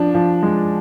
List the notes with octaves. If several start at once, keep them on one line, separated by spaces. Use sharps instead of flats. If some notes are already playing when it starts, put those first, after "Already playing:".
Already playing: F3 D4
F3
G#3